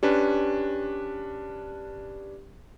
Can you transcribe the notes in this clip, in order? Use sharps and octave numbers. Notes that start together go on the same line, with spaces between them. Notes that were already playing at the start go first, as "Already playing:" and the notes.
C#4 D4 G4 B4